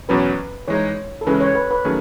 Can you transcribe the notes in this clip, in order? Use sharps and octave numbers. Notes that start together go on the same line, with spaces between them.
E2 B2 F#3 C#4 B4
E3 G#3 D#4 C#5
A4
C#3 E3 G#3 C#4 B4
C#5
B4
B4
D#3 F#3 A3 C#4 G#4